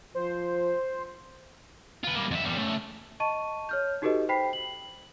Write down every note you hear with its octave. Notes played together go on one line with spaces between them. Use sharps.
F3 C5
F4 B4
G3 A#3
F2 E5
E2 G3
C#3 A3
D#5 A5 C#6 D#7
C#5 F6 G6
D#4 F#4 G4 A4 B4 D#5
C5 G5 B5 B6 C7
F#7